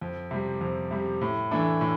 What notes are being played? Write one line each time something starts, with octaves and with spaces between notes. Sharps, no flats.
F2
C3 G3
F2
C3 G3
A2
E3 A3 D4
A2